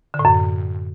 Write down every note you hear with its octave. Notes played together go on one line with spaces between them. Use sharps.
D3
A2
F#2